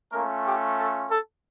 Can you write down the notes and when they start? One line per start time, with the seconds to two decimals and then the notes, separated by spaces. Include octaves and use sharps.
0.11 A3 A#3 C#4 F4 A#4
0.44 G4
0.76 A4
1.08 A4